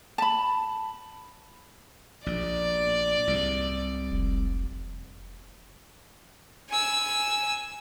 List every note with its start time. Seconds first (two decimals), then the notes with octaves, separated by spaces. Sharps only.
0.18 A5 B5
2.26 A#1 D5
3.27 C2 G#2
4.11 F1
6.69 G#5 E6